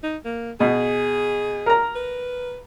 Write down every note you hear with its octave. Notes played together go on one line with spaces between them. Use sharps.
D#4
A#3
B2 G#4
A#4 A#5
B4